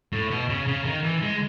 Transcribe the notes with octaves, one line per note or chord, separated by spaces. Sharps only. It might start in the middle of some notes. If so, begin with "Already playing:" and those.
A2
B2
C#3
C#3
D#3
E3
G#3